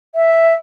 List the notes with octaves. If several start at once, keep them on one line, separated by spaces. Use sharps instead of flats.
E5